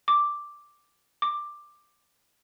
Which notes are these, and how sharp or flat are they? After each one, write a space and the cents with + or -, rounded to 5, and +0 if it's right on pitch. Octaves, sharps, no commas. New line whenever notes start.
D6 +0
D6 +10